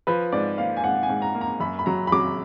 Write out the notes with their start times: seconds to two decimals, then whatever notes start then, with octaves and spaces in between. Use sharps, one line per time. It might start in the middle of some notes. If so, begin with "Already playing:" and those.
0.07 F3 B4
0.32 G#2 D5
0.58 A#3 F5
0.76 G#5
0.84 G#2 F#5
1.03 G#5
1.09 G#2
1.22 A#5
1.35 A#3
1.41 A#5
1.60 F#2 B5
1.79 B5
1.86 F#3 A#5
2.07 B5
2.12 F#3 D6